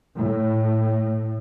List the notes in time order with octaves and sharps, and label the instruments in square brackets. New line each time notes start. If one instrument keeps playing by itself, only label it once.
[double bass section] A2